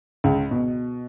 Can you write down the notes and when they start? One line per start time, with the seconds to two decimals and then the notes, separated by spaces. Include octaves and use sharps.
0.24 C#2
0.51 B2